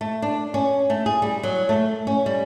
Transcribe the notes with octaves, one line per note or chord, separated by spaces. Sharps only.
A3
D4
C#4
A3
G#4
G3
F#3
A3
C#4
G3